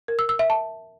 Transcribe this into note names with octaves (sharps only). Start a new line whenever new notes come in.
A#4
E6
E6
E5
A5